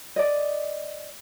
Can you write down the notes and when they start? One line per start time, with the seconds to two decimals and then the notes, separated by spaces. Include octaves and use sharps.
0.16 D5 D#5